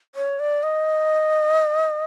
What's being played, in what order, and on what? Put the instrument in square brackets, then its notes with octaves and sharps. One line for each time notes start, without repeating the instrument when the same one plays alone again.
[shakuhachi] C#5
D5
D#5